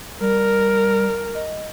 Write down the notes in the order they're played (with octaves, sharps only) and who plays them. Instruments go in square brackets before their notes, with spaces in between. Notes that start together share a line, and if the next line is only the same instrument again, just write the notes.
[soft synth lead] G3 [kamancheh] A#4
[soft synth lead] D#5